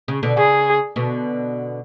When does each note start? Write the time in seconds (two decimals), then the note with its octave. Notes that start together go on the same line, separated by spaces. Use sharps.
0.08 C#3
0.23 B2 D3
0.37 C#3 G#4
0.96 B2 D3